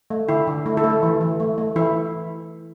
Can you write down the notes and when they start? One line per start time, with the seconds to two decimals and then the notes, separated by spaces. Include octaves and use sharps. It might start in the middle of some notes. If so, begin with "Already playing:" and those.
0.10 A3
0.29 D3 E4
0.47 D3
0.66 A3 E4
0.77 E4 A4
0.84 A3
0.90 E4
1.03 E3
1.21 E3
1.40 A3
1.58 A3
1.76 E3 E4